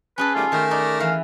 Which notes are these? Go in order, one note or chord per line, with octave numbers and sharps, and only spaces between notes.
C#4 G#4 A4 B4
D#3 G3 A3 F4
D#3 A3 G#4 A#4
D#4 D5
E3 F5